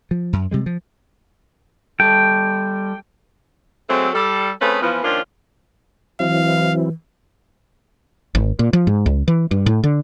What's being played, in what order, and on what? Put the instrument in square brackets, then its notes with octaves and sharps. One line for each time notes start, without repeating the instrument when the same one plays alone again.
[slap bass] F3
F#2
C3 G3 G#3
F3
[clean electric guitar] G3 A4 [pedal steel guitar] G5
[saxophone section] F#3 G#3 A3 C4
G3 A4
A3 C4 C#4 G#4 B4
E3 F3 B3
D#3 F3 A#3 C#4 D4 F4
[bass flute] E3 [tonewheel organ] F#3 C4 E4 [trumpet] F5
[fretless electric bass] G#1
A#2
F3
G#2
C#2
E3
G2
A2
D3